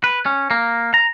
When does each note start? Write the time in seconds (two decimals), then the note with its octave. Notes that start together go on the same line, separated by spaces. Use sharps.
0.04 B4
0.26 C#4
0.51 A#3
0.94 A#5